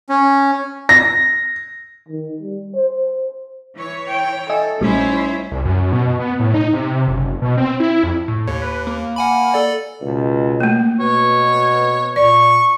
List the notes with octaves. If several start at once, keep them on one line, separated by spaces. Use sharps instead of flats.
C#4
A#6
D#3
G3
C5
E3 C#5
G5
A4 D#5 E5 G#5
A#1 G3 A3 C#4 D#4 E4 C5
C2
F#2
B2
B3
A2
D#4
C3
F#1
B2
C4
E4
F2
A2
D#2 C#5
B4
A#3
F#5 G#5 B5
A4 D5
C#2 B2
A3 A#3
B2 B4 C#5
A#2 D5 C#6